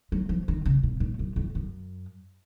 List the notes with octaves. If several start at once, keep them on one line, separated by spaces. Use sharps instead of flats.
F#3
F3
D#3
C#3
B2
A#2
F#2
F2
F#2